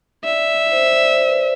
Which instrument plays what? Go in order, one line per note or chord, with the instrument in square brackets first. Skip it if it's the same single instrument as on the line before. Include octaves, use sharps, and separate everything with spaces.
[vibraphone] D5 [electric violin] E5
[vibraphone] C5
D5
C5
B4